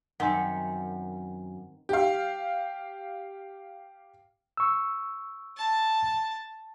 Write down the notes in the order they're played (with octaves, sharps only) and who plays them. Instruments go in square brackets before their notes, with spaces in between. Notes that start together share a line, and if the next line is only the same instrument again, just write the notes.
[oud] F#2 [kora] D#3 C4 [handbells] F#5 G#5
[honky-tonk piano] G4 F5
[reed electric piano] C#6 E6
[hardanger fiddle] A5